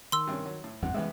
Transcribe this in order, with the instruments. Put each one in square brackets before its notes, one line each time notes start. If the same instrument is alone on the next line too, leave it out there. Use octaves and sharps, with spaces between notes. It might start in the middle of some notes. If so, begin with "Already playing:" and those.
[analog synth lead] D#3 [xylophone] C6 E6
[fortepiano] G2 C3 C#4
F#3
A2
[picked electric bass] G#1 E2 G2 [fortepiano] C3 [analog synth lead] F#5
[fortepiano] C2 F#2 B3 [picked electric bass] E3 G#3 [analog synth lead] E5